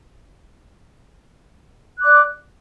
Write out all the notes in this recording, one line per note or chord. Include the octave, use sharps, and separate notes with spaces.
D5 D6 F#6